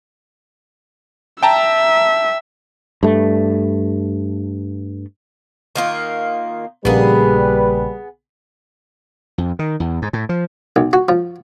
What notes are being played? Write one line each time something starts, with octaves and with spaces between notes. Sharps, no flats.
E5 G5 A5 A#5
G2 A3
D#3 A#3 F4
A#1 C#3 G3 A#3 B3 G#4 B4
F2
D#3
E2
G#2
A2
F3
B1
F#4
F3